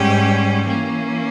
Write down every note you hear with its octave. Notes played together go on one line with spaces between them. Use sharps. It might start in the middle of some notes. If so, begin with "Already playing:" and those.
Already playing: G#2 G3 C#4 G4
E3 A#3 C#4